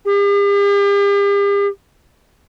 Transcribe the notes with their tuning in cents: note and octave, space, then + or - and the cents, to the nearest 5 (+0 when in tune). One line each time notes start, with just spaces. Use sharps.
G4 +45